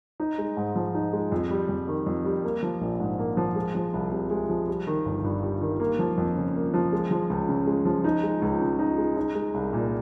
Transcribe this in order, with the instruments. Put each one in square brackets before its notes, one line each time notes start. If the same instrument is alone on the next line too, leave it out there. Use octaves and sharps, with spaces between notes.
[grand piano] D#4
G#3
G#2
F3
D#4
G#3
F2
G3
F2
D#3
F2
G3
A#3
F3
A#1
G#2
A#3
F3
G#3
F3
C2
C3
G#3
F3
G3
D#3
G1
G2
G3
D#3
A#3
F3
F2
C#3
A#3
F3
G#3
F3
C#2
C#3
G#3
F3
D#4
G#3
C#2
C#3
D#4
G#3
D#4
G#3
C2
A#2